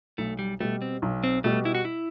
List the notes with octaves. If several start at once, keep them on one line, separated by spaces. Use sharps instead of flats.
B1 A3
G3
B2 G3 A3
C4
B1
C4
B2 G3 A3
E4
F#4
E4